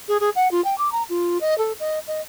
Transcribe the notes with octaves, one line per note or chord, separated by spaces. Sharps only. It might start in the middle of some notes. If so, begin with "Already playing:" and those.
G#4
G#4
F#5
F4
G5
D6
A#5
F4
D#5
A4
D#5
D#5